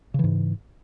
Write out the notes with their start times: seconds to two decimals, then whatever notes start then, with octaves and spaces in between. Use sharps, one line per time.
0.14 C#3
0.19 E3
0.24 G#2